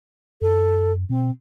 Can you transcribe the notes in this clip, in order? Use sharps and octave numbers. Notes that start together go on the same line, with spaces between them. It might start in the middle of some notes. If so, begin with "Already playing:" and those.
F#2 A4
B2 C4